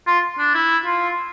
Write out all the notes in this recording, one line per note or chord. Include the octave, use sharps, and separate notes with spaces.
F4
D4
E4
F4